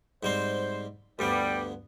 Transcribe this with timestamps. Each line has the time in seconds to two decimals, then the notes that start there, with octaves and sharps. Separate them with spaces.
0.23 G#2 G3 C4 C5
1.19 D2 G2 G3 B3